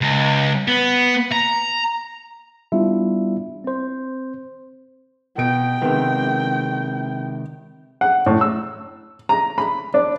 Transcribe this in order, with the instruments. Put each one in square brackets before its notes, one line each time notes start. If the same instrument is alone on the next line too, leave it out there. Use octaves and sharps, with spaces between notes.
[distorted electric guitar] C#2
B3
A#5
[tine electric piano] G3 B3 D4 E4 F4 E5
C4 C5
[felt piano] B2 D7 [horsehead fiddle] G5
[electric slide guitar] C3 D#3 G#3 [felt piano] B3
[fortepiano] F#5
A2
E6
A#5
B5
D4